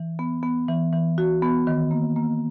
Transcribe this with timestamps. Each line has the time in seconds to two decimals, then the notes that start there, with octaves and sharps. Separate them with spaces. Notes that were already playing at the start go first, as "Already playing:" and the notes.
Already playing: E3
0.19 B3
0.43 B3
0.68 E3
0.93 E3
1.18 F#4
1.42 B3
1.67 D#3
1.91 A#3
2.16 A#3